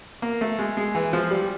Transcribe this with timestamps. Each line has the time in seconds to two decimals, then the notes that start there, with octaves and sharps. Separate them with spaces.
0.22 A#3
0.41 A3
0.59 G#3
0.77 G#3
0.95 E3
1.13 F3
1.31 G3